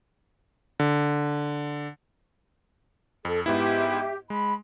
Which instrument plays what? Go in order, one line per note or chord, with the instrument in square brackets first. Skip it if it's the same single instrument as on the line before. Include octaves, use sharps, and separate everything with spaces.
[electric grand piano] D3
[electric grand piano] F2 [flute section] A4
[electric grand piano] G#2 B3 E4 [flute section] G4 E5
[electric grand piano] G#3 [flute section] B5